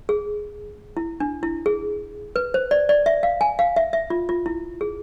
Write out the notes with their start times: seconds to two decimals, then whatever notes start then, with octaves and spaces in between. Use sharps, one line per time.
0.09 G#4
0.97 E4
1.20 D4
1.43 E4
1.66 G#4
2.36 B4
2.54 C5
2.71 D5
2.89 D5
3.06 E5
3.23 F5
3.41 G#5
3.59 F5
3.76 E5
3.93 E5
4.10 F4
4.29 F4
4.46 E4
4.81 G#4